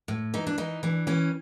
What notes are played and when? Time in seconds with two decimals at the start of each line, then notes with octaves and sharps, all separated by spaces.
0.08 A2
0.34 E3 D#4
0.47 D4
0.58 E3 D#4
0.83 E3 D4
1.07 E3 C#4